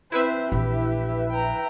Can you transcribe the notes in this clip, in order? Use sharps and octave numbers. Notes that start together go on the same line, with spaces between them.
C4 E4 B4 C5 E5
A#1 E3 G4
G5 A#5